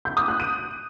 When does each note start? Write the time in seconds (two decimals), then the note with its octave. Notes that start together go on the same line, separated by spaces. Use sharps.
0.05 G6
0.17 D#6
0.28 F#6
0.40 D#7